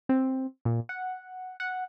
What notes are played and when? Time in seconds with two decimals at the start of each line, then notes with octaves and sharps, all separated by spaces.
0.09 C4
0.65 A#2
0.89 F#5
1.60 F#5